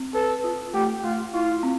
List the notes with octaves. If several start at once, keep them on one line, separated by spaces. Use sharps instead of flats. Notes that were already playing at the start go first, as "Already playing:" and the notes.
Already playing: C4
A4 B4
F4
A3 G4
A3 F4
E4 F4
C4